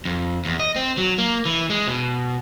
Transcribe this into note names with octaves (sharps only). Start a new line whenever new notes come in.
F2
E2
D#5
C4
F#3
A#3
E3
G#3
B2